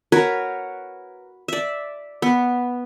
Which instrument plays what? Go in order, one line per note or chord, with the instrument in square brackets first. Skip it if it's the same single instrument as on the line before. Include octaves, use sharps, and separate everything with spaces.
[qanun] F#4 A#4 B4 C#5
D5 E5
B3